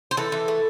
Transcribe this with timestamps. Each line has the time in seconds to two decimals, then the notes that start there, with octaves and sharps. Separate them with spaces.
0.11 C5
0.17 E3 A4
0.32 E3
0.48 A3